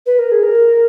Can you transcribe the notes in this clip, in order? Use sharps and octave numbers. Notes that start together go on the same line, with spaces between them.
B4
A#4
G#4
A#4